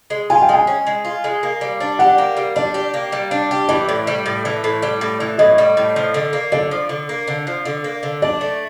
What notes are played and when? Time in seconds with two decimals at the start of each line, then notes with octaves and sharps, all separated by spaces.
0.10 G#3
0.30 F4 G#5
0.42 G5
0.49 G#3
0.54 G#5
0.67 C#4
0.87 G#3
1.05 F4
1.24 G#3
1.43 A#3
1.61 G3
1.80 D4
1.99 G4 F#5
2.18 A#3
2.37 G3
2.56 D4 D5
2.74 G4
2.94 A#3
3.12 G3
3.31 D4
3.51 G4
3.69 E3 D5
3.89 A2
4.07 G3
4.26 A2
4.45 E3
4.64 A2
4.82 G3
5.01 A2
5.20 E3
5.38 A2 D#5
5.58 G3
5.77 A2
5.96 F3
6.14 D3
6.33 A#3
6.52 D3 D5
6.71 F3
6.89 D3
7.09 A#3
7.28 D3
7.47 F3
7.65 D3
7.84 A#3
8.03 D3
8.22 D4 D5
8.41 A3